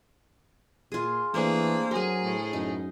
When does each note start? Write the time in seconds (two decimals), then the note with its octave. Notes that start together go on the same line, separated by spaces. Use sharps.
0.92 A#2 F4 G#4
1.34 E3 A3 A#3 C4 D4 G#4
1.91 F#3 G#4 A#4 G#5
2.23 A2
2.53 F#2 D#4